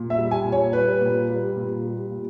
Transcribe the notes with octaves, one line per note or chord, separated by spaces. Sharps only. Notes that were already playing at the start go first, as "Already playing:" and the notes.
Already playing: A#2
E5
G3
G#5
A#2
C#5
G3 B4
A#2
G3
A#2
G3
A#2